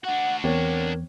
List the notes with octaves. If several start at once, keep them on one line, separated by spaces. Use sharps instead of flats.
D4 F#4 F#5
E2 C4 A#4 C#5